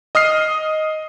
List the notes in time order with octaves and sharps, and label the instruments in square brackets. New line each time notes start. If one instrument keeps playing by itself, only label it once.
[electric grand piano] D#5 D#6 F6 C7